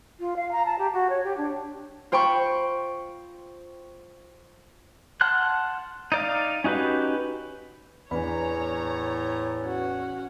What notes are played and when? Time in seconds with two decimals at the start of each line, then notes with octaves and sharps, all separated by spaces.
0.20 F4
0.36 F5
0.52 A#5
0.66 A5
0.79 G4
0.93 F#4
1.10 C#5
1.24 G4
1.37 D4
2.12 F4 C5 G5 B5 C#6
5.21 F#5 A5 C6 F6 F#6
6.12 D#4 D5 F5
6.64 C#4 D#4 F#4 G4 B4
8.11 E2 A2 D4 B4 C#5 G#5 A#5 B5
9.62 C#4 F#4